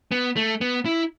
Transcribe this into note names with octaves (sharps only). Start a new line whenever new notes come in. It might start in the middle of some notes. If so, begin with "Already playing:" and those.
B3
A3
B3
E4